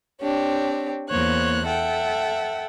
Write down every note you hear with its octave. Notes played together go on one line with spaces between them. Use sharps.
C4 D4 G4 C#5
E2 A#3 C5 C#5 F#6
A4 E5 F#5 G5